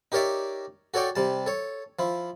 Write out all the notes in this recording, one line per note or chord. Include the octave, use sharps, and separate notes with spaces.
D#4 G4 A#4 C#5 D5 E5
F#4 A4 C#5 D5 G5
C3 G3 A5
A4 C#5
F3 E4